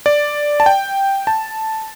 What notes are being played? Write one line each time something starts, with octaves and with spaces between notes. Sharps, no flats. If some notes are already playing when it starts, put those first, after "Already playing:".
D5
A5
G5
A5